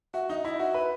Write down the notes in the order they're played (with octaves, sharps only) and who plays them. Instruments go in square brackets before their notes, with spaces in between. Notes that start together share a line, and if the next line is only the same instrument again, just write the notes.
[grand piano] F#4 [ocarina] E5
[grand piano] D#4 [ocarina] E5
[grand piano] E4 [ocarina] D#5
[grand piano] F#4 [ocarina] E5
[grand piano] B4